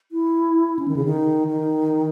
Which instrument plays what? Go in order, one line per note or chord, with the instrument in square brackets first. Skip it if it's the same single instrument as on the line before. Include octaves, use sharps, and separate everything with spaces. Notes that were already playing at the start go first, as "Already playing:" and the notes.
[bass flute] E4
C#4
D#3
C#3
D#3
D#3